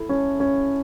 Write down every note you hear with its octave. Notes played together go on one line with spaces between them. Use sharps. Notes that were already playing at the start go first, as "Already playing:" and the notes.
Already playing: E4 A4
C#4
C#4